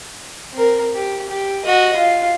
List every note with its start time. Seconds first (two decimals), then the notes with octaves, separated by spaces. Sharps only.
0.53 C4 A#4
0.94 G4
1.29 G4
1.65 F#4 D#5
1.96 F4